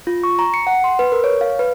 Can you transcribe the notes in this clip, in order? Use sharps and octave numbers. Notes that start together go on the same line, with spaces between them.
F4
C#6
A#5
C#7
F#5
C6
B4
A#4
C#5
F5
B4